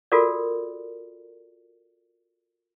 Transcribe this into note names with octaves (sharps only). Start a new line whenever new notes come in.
F4 F#4 A4 A#4 D5